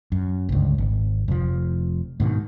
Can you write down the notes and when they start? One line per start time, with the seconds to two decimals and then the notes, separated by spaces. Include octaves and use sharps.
0.12 F#2
0.49 G1 C#2
0.78 G#1
1.28 F1 F3
2.20 G#2 B2 D#3